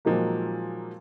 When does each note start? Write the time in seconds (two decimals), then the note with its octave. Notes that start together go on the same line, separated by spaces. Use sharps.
0.05 A#2 D#3 F3 F#3 G#3 A#3